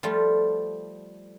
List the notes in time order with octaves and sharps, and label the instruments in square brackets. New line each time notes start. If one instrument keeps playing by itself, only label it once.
[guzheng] F3 G3 A3 F4